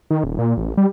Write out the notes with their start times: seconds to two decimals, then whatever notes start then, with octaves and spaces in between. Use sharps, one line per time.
0.11 D#3
0.24 D#1
0.39 A#2
0.58 A1
0.78 G3